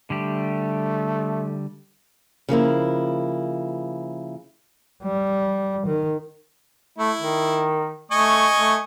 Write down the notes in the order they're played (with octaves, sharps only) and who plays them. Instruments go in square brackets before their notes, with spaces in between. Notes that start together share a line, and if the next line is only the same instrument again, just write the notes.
[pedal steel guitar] D3 G3 G4 [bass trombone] A3
[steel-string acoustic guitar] C#3 F3 A#3 E4
[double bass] G3
D#3
[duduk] A3 [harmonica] E4
[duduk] D#3
[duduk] A3 [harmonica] D#5 G#5 C#6
[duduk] A3